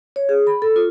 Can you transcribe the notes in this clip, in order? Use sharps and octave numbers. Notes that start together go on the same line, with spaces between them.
C#5
G#4
B5
A4
F4